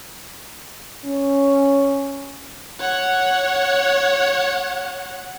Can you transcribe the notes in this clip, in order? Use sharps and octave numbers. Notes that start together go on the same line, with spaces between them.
C#4
C#5 F#5